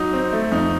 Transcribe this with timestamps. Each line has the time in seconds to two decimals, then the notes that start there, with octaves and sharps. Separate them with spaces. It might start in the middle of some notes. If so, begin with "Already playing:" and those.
Already playing: F#3 D#4
0.14 C4
0.33 A3
0.52 F2 D#4